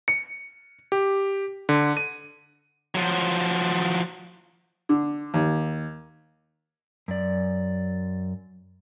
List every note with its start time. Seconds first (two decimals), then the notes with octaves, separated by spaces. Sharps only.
0.08 C#7
0.92 G4
1.69 D3
1.97 D#7
2.95 F3 F#3
4.89 D3
5.34 D#2
7.08 F#2 D5